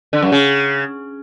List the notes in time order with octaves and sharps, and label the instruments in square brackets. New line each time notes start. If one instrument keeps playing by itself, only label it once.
[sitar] D3
F#2
C#3